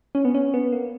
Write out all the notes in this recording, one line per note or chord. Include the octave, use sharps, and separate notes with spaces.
C#4
B3
C#4
B3
A#3